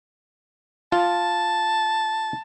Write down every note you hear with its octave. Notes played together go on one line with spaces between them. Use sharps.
F4 A5